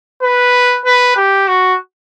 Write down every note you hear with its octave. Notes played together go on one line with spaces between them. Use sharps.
B4
B4
G4
F#4